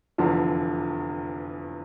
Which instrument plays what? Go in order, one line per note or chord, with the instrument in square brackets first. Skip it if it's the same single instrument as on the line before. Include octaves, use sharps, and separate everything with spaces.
[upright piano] F1 E2 D3 F3